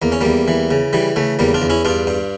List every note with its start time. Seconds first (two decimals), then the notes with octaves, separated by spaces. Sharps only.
0.02 E2 A#3
0.12 C#4
0.21 E2 G3 A#3
0.48 E3
0.71 C#3
0.93 E3 G3
1.16 C#3 A3
1.39 E2 G3 A#3
1.54 D4 F4
1.62 E2
1.70 C#4 E4
1.85 G2 D4 F4
2.07 G2